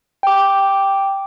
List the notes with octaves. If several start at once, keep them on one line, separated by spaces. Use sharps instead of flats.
G5 D6